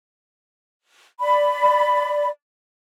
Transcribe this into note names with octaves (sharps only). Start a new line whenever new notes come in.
D5 B5